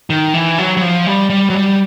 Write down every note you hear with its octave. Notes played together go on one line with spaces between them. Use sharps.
D#3
E3
F#3
F#3
F3
G3
G3
F#3
G3